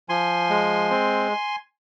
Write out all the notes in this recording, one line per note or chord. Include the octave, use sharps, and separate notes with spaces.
F3 G#5 C6
G#3
C4